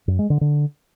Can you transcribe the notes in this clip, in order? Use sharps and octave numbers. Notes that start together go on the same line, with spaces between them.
F#2
G#3
D3
D3